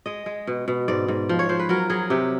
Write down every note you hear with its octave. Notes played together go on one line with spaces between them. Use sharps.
G#3 D#5
G#3
B2
B2
G#2 D5
G#2
F3
C#5
F3 C5
B4
F#3 A#4
F#3 G#4
C3 G4